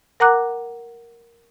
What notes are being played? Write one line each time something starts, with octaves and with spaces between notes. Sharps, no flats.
A#4 F#5 A#5 D6 F#6